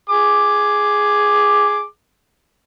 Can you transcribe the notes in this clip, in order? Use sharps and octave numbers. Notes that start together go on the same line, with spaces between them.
G#4 D6